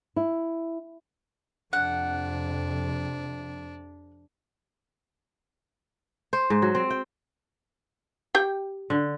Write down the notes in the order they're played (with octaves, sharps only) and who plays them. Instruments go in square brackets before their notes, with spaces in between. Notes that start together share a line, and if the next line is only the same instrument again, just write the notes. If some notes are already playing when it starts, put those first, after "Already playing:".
[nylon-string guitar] E4
[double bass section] F2 C3 [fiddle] D4 [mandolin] F#5
[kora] C5
G#2
F#3
C4
G5
[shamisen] G4 G5
[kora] D3